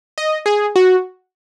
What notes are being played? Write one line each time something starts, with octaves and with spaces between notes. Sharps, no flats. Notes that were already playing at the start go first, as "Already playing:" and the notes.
D#5
G#4
F#4